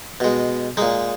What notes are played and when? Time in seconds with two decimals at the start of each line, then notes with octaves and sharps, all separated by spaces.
0.20 B2 G#3
0.77 A#2 G#3 D#4